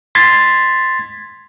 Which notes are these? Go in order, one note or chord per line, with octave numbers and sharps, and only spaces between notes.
C6 G#6 A6 B6